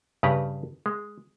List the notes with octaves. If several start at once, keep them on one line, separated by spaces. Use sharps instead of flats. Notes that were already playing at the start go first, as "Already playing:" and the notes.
G2 C#3 C#4 G4 B4 A#5
G#3